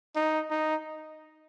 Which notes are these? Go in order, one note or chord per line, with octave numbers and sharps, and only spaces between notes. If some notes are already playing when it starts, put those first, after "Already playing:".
D#4
D#4